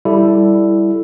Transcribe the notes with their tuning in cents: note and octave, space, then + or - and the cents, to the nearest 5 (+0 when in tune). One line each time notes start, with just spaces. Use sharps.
G3 +0 E4 +5 A4 +0